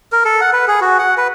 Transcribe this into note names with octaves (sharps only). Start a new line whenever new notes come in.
A#4
A4
F#5
B4
G#4
F#4
F#5
B4